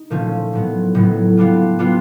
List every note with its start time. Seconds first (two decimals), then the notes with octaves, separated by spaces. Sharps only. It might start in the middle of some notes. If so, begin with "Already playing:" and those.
Already playing: D#4
0.10 A#2 F3 A3 C#4
0.53 A2 F#3 B3
0.95 A2 F#3 B3
1.37 G3 B3 D4 F4
1.79 G3 B3 D4 F4